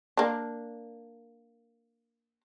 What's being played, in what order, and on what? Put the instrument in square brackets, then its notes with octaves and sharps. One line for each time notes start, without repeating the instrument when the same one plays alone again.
[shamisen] A#3 D4